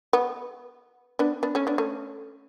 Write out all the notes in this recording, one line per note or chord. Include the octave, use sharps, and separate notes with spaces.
B3
B3 D4
B3 D4
A3 C#4
B3 D4
A3 C#4